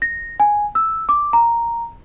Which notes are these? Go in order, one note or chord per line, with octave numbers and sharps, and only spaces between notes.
A#6
G#5
E6
D6
A#5